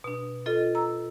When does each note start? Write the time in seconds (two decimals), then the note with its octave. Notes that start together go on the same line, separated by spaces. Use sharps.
0.04 B2 D4
0.46 F4 A4 D#5
0.75 A#5 E6